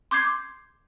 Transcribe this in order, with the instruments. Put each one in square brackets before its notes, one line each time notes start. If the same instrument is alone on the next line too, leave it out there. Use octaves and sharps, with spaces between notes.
[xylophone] C6 D6 G6 G#6 C7